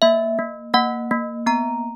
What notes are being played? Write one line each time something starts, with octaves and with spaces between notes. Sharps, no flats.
A#3 E5
A#3
A#3 F#5
A#3
B3 A#5